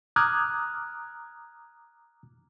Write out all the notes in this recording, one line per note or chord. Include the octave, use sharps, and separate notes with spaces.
A#5 D6 D#6 F6 F#6 G#6